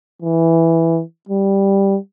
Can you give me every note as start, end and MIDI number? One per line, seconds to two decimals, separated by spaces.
0.22 1.02 52
1.29 1.97 55